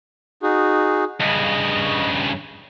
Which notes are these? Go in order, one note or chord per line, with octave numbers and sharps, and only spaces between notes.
D#4 F#4 G#4
G2 C#3 D#5